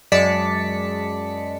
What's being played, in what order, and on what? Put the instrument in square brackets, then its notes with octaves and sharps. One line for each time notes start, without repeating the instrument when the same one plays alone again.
[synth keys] F#2 G#3 D5 A5 B6 C#7